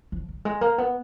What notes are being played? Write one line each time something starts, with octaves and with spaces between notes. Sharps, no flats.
F3
F#3
G#3
A#3
B3